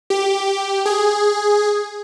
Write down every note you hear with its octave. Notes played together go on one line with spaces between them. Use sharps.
G4
G#4